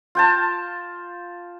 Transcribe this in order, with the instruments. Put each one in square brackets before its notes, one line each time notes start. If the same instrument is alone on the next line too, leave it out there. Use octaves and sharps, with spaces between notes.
[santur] F4 G5 A5